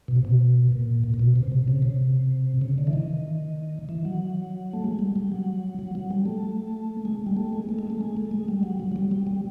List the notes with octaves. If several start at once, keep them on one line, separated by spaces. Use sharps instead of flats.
B2
C3
B2
A#2
A#2
A#2
B2
C3
C3
C#3
C3
C#3
D3
E3
D#3
E3
F#3
A3
G#3
G3
G3
F#3
F#3
F#3
G3
A3
G#3
G3
A3
G#3
A3
G#3
A3
G#3
A3
G#3
G3
F#3
F#3
F#3
G3
G3
G3